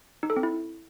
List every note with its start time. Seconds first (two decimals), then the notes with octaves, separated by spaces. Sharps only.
0.23 D#4
0.30 A4
0.37 C4
0.43 E4